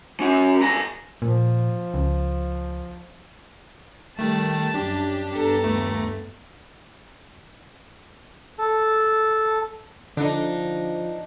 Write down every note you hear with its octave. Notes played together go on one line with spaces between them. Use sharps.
C#4 F#4
G2 A#5
A#2 F3
C#2
D#3 G3 A3 A5
F#2 D4 G4
G2 B3 A4 A#5
D#2 A3
A4
D3 F3 D4 D#4